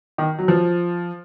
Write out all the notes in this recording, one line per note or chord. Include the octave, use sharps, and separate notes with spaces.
D#3
F#3
F3